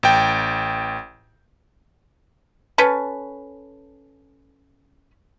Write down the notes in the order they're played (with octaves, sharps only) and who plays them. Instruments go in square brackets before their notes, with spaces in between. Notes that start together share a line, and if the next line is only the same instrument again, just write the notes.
[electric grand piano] A1 G5
[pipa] C#4 A4 B4